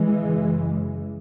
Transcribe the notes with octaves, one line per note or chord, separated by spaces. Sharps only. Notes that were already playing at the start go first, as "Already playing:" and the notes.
Already playing: E3 G#3
F#2 C#3